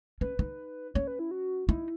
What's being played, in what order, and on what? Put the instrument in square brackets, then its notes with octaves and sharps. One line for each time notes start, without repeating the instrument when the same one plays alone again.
[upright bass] C#4 [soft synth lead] B4
[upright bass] D#4
[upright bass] C#4 [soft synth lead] C#5
[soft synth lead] B4
E4
F#4
[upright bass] D#4 [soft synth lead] E4